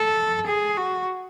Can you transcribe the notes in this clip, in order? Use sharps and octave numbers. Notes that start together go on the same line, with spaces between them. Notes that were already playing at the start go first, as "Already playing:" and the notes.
Already playing: A4
G#4
F#4